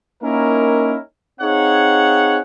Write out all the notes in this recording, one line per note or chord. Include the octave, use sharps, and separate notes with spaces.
A#3 C#4 D#4 E4 A#4
C4 D#4 G#4 C#5 F5 F#5